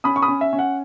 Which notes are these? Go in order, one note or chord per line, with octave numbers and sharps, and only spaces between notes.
C#4 B5 D#6
C#6
B5 D#6
C#4
E5
C#4
F#5